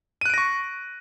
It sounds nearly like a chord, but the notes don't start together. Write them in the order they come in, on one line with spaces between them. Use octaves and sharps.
D#7 F#6 D7 A#6 C#6